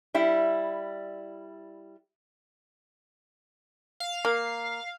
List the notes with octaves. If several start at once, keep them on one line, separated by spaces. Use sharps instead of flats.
G3 E4
F5
A#3